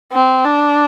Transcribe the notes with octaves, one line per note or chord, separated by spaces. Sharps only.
C4
D4